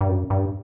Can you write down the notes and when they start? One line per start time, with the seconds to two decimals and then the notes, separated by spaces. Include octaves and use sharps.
0.01 G2
0.09 F#2
0.30 G2